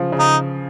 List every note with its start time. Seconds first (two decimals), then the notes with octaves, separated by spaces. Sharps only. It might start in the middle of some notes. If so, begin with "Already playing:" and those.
Already playing: C#3 F3
0.12 C#3
0.19 D#4